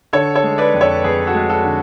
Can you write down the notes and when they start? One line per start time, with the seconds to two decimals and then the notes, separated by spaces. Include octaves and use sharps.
0.13 D3 A4 C#5
0.35 A4 C#5
0.43 G#3
0.58 B4 D5
0.74 F2
0.81 A4 C#5
1.04 F2 G#4 B4
1.27 F#4 A4
1.34 G#3
1.49 F#4 A4
1.64 D3